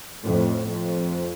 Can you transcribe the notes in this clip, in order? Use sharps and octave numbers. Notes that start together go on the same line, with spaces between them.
F2 A2
F2